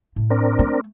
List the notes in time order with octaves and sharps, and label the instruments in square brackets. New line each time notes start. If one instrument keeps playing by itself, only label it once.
[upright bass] A2
[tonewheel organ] C4 D4 A#4
[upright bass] A3